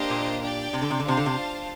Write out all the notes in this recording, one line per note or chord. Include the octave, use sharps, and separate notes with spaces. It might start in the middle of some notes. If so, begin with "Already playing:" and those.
Already playing: A#3 D4 G4 C5 D#5
A#2
D4 G4 D5 G5
C3
D3
C3
D3
C3 D4 F4 C5 F5 A5
D3
C3